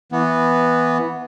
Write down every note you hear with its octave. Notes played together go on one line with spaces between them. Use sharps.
E3 B3